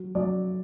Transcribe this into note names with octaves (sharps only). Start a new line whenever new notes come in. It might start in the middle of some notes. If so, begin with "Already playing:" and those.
Already playing: F#3
F#3 D5